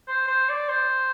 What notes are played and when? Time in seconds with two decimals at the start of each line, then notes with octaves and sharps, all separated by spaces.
0.08 C5
0.28 C5
0.49 D5
0.69 C5